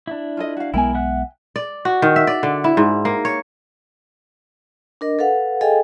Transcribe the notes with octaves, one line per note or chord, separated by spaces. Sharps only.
D4 E4
F4 A4 D#5
F#4 F5
B1 G#3 B3 E4 A#4 G5 G#5
E5 F#5 F#6
D5
F#4
D#3
E5
D5
D3
E4
G#2
A#3
C#5
D4 A#4 D#5
A4 B4 F5 F#5
G#4 A4 D#5 F5 G5 G#5